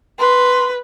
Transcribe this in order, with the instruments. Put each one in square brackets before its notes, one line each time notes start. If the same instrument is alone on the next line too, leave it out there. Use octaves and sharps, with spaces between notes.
[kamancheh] B4 [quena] C6